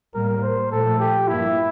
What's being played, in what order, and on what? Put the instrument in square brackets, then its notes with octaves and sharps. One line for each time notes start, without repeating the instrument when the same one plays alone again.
[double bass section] A2 G3 A#3 [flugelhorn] A#4
[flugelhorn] C5
[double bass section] A#2 F3 A3 [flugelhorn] A4
[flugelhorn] G4
[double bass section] G2 F3 A#3 [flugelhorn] E4